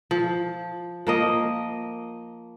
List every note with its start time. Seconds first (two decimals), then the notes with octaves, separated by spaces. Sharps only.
0.11 F3
1.07 F3 A#3 D#5